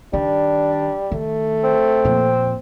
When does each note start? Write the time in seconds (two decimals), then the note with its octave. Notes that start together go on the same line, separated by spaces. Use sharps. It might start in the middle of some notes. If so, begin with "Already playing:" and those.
0.13 D#3 G3 D4
1.12 D#3 A3
1.64 C4
2.04 F2 A#2